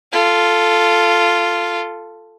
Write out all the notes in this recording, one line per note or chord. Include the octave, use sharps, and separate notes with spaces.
F4 A4